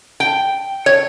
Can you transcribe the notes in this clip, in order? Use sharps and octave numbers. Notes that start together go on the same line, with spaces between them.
G5
C#5